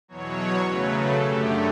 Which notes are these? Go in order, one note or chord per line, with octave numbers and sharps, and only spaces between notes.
E2 B2 F#3 C#5
C#3 F#3 A3 B4
A4
F#2 D3 A3 G4